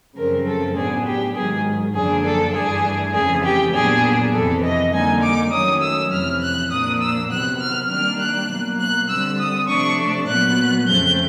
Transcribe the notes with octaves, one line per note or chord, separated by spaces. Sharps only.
F#2 C#3 F3 A3 C4 A#4
A4
A2 F#3 B3 D4 G#4
G4
G#2 D#3 F#3 G#4
F#2 D3 F3 A#3 D4 G#4
A4
G2 E3 A3 D4 G#4
F2 C#3 E3 A3 G#4
G4
A#2 F#3 B3 D4 G#4
F2 C3 E3 A4
D#5
D3 G3 A#3 D#4 G#5
D6
D#3 F#3 A3 C#4 D#6
E6
F2 C3 E3 F6
F#6
A#2 F3 A#3 D4 D#6
E6
C3 D#3 F#3 B3 F#6
F6
D#3 G3 A#3 D4 F6
F#6
B2 F#3 A#3
F#6
D3 G3 C4 E6
D#6
C3 F3 A3 D4 C#6
A#2 F#3 B3 F#6
F2 C#3 F3 A3 C4 G6